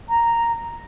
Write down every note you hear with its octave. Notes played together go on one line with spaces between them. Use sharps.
A#5